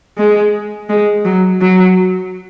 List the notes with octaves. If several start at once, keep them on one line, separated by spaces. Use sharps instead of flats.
G#3
G#3
F#3
F#3